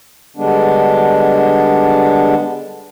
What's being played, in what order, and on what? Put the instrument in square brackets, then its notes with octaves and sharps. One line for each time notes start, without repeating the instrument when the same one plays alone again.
[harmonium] D3 G3 G#3 B3 D4